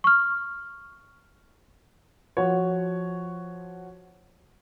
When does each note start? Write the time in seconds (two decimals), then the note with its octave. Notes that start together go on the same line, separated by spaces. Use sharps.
0.04 C#6 F6
2.37 F3 F4 F#4 C#5